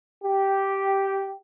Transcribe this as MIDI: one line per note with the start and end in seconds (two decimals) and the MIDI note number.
0.24 1.34 67